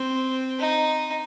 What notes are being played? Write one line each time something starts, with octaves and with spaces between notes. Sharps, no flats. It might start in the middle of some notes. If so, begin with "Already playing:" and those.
Already playing: C4
D#4